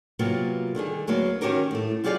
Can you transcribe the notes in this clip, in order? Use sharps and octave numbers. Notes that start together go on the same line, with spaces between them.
C3 F#3 A#3 B3 F4
D3 D#3 G3 G#4
D2 F#3 A#3 B3 F5
D#3 C#4 F#4 G4 A#4 C#5
A2 A3
F#3 F4 G4 G#4 D5 F5